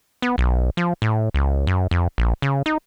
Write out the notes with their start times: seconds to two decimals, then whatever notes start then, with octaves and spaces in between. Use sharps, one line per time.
0.22 B3
0.38 B1
0.77 F3
1.02 A2
1.34 C#2
1.67 F#2
1.91 F2
2.18 A#1
2.42 C#3
2.66 D#4